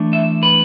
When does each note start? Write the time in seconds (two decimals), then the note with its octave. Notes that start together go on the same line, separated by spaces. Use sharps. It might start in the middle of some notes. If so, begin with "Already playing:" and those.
Already playing: E3 A3 D4
0.13 E5
0.43 B4